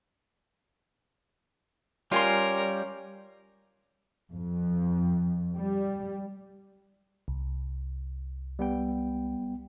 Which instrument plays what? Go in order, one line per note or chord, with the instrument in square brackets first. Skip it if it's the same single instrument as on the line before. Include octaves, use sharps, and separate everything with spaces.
[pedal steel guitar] G3 [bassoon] C#4 [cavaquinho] F4 G#5 C6 [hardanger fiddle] A#4
[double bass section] F2
G3
[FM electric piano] C2
[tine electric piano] G3 B3 G5